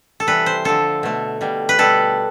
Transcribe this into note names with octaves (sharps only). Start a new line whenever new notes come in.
A4
C3 E3 G3 B4
C5
D3 F3 A3 A4
B2 A3
B2 G3
B4
B2 G3 A4